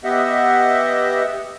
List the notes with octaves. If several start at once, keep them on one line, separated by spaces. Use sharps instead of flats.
B3 G4 D#5 E5 F#5